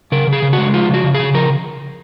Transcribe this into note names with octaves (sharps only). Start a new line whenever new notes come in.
C#3 A#4
C#3
G#4
C#3
F#4
G#3
F3 F4
C#3 F#4
C#3
C#3 G#4
F3 A#4